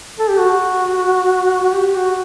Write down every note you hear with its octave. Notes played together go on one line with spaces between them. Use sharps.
A4
G4
F#4
F#4
G4
F#4